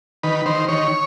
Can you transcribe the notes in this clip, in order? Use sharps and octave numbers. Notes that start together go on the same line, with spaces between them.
D#3 B4
D#3 C5
D#3 C#5